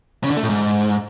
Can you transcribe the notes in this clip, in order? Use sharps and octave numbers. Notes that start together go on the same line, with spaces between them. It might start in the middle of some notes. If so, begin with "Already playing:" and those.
C#3
D3
A3
A2
G#2